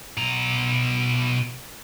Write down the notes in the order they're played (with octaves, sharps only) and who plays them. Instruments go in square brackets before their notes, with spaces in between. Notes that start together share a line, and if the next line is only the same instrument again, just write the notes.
[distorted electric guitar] B2 A#5